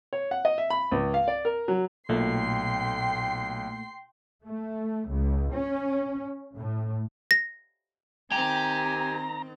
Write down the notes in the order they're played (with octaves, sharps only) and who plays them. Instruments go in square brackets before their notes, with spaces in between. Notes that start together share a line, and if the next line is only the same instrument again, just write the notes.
[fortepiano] C#5
F#5
D#5
E5
B5
C#2
F5
D5
A#4
F#3
[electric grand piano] B1 [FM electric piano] A#2 A3 [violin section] G5 C6 C7
[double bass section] A3
C#2
C#4
A2
[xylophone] A#6
[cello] D#3 C4 [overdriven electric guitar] G4 [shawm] G#5 [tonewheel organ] A#5